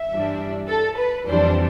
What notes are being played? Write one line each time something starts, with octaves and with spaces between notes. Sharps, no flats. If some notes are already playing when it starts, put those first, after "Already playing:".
Already playing: E5
G2 E3 G3 D4
A4
B4
F2 E3 G3 D4 C5